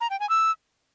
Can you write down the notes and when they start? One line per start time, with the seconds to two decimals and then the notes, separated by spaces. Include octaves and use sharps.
0.01 A#5
0.10 G5
0.20 G#5
0.30 E6